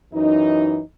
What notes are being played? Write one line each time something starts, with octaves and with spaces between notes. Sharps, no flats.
F#2 E3 D#4